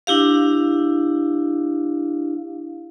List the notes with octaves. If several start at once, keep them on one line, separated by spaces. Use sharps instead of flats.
D4 E4 G4 F5